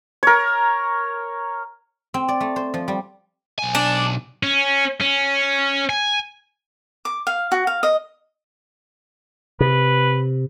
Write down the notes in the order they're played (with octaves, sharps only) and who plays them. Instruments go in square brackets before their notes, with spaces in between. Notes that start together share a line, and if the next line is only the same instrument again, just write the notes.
[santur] A#4 C#5
[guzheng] C4
D5
A3
C5
F3
G3
[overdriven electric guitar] B1 G#5
[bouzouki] D4
[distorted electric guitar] C#4
C#4
G#5
[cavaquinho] D6
F5
F#4
F5
D#5
[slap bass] C3 [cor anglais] B4